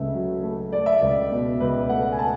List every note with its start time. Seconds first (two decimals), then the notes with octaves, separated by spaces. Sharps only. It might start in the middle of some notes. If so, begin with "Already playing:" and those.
Already playing: C#2 C#3 A3 E5
0.14 F#3
0.43 A3
0.72 A3 D5
0.86 E5
1.01 C#2 D5
1.32 B2
1.60 C#2 B4
1.89 A3 F#5
2.12 G#5
2.19 A5